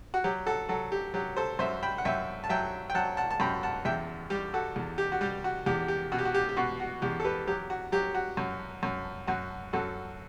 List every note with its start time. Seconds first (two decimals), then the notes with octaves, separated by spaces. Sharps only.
0.14 F#4
0.24 F#3 G4
0.46 F#4 A4
0.69 F#3 F#4 A4
0.92 G4
1.14 F#3 G4
1.37 A4 C5
1.59 F#2 C5 E5
1.83 G5 B5
1.98 F#5
2.05 F#2 E5 G5
2.44 A5
2.49 F#3 E5 G5
2.90 G5
2.95 F#3 F#5 A5
3.17 F#5 A5
3.31 A5
3.40 F#2 G5 B5
3.63 F#5 A5
3.85 E2 E5 G5
4.30 G3 G4
4.54 F#4 A4
4.76 E2
4.98 G4
5.12 F#4
5.21 G3 G4
5.44 F#4
5.66 E2 G4
5.88 G4
6.12 B2 F#4
6.18 G4
6.25 F#4
6.34 G4
6.49 G4
6.56 B2 F#4
6.80 F#4
7.02 E2 G4
7.20 A4
7.24 G4 B4
7.47 F#3 G4
7.70 F#4
7.92 F#3 G4
8.15 F#4
8.37 F#2
8.83 F#2
9.27 F#2 F#4
9.73 F#2 F#4 A4